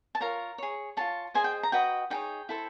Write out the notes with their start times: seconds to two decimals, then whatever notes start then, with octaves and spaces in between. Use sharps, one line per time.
0.15 A5
0.21 F4 A#4 C#5 A#5
0.58 G#4 C#5
0.97 F4 G#4 C#5 A5
1.34 G#4 C5 D#5 G#5
1.44 G5
1.63 A#5
1.72 F#4 B4 D#5 G5
2.10 D#4 G#4 C#5 G5
2.49 E4 A4 C5